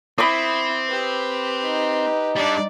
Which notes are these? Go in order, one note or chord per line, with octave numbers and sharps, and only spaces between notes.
C4 E4 B5 D6 D#6
G4 B4
D#4
G3 D4 D5